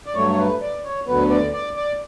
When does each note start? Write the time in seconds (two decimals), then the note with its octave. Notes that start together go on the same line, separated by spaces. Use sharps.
0.06 D5
0.15 G2 F#3 A3 C#5
0.31 C#5
0.38 B4
0.61 D5
0.84 C#5
1.07 D2 D3 F#3 B3 B4
1.30 D5
1.53 D5
1.76 D5